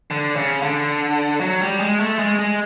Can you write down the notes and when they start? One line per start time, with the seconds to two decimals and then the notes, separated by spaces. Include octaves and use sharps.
0.11 D3
0.36 C#3
0.63 D3
1.41 F#3
1.61 G3
1.80 G#3
2.00 A3
2.19 G#3
2.39 G#3